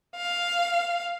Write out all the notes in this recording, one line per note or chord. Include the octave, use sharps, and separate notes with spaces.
F5